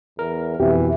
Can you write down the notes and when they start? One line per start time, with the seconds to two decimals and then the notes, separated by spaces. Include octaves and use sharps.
0.19 E2 A#4
0.60 F2 B2 E3 G4